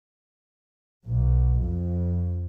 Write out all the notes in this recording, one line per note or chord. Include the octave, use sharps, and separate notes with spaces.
B1
F2